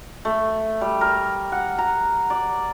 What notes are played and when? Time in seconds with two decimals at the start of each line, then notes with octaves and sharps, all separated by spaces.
0.25 A3
0.81 G3
1.01 A#4
1.52 F#5
1.78 A#5
2.30 D5